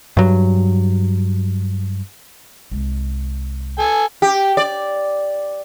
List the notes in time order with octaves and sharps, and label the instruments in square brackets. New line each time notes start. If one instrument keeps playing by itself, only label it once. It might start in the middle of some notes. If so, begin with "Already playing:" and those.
[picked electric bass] G2 F#3
[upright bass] C2 G#3
[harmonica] A4 G#5
[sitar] G4
D5